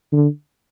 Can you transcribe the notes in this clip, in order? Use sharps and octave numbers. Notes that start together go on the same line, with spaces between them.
D3